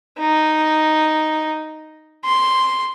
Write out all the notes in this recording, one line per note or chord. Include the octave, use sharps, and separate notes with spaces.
D#4
C6